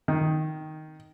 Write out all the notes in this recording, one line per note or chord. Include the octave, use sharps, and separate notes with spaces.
D#3